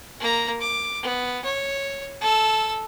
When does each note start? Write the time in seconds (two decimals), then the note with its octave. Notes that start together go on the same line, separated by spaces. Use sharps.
0.20 A#3 A#5
0.61 D6
1.03 B3
1.45 C#5
2.21 A4 E6